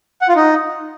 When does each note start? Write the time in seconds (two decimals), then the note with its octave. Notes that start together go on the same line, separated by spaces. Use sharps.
0.22 F#5
0.29 F4
0.36 D#4